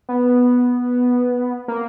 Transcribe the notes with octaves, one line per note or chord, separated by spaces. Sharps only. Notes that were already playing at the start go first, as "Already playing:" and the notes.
B3
A#3